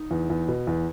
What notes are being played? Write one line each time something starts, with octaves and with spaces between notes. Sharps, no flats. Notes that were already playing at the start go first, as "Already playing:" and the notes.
Already playing: D#4
E2
E2
B2
E2